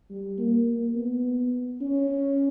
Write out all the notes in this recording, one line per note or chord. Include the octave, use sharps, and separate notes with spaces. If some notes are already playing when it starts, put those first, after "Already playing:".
G3
A#3
A#3
B3
C#4